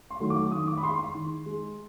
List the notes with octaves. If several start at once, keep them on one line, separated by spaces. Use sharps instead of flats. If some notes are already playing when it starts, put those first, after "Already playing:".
C6
D#3 F#3 A3
D6
D#3 D#6
D6
B5
G#3 C6
C6
D#3
G#3